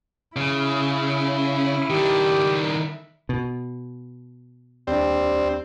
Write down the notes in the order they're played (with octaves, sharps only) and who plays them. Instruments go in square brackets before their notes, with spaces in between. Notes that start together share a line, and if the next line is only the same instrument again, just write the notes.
[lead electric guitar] C#3 [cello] E4
[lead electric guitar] D#3 D4 [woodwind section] G4
[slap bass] B2
[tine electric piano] D#2 D4 [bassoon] G3 [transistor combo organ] C4